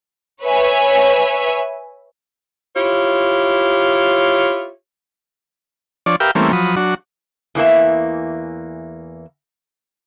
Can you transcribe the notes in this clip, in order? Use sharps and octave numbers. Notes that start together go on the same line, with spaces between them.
B4 C#5 E5 G#5
E4 F4 G4 C#5
F3 D4 C#5 D5
G4 A#4 B4 E5 F5 G5
E3 G3 A3 A#3 C4 C#4
F3 F#3 B5 D#6
F#3 D4 F#4
E2 E3 A#3 E5